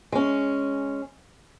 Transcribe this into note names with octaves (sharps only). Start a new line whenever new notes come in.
G#3 C#4